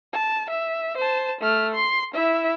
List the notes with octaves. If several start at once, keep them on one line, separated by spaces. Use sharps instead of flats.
A5
E5
C5 A5
A3 F6
C6
E4 E5